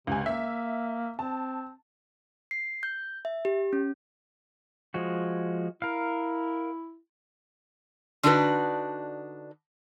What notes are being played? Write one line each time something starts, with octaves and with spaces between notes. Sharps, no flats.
C#2 C3 G#5
A#3 E5
C4 A5
C7
G6
E5
G4
C#4
F3 G#3 F#4
E4 A#4 F5
D3 D4 D#4 F#4 A4 B4